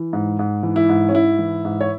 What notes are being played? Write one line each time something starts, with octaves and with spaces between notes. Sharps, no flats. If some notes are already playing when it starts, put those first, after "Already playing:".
Already playing: E3
G#2
G#2
E3
E4
G#2
C#4
G#2 E4
E3
G#2
C#5